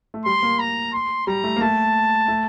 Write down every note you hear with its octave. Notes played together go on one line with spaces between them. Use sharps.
A3
G3 C6
A#3
A#5
C6
G3 A#5
A3
A#3
A3 A5
A3